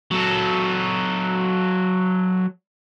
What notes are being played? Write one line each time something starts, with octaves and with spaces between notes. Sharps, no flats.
F#3 A4